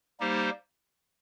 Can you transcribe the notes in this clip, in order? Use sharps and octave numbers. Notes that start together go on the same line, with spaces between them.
G3 A#3 D#4 G4 C5